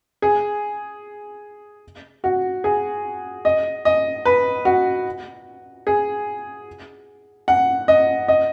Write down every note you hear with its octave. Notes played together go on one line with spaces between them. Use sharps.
G#4
F#4
G#4
D#5
D#5
B4
F#4
G#4
F#5
D#5
D#5